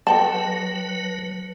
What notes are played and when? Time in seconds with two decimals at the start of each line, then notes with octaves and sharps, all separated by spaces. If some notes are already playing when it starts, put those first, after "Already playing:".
0.07 F#3 A4 B4 G5 A5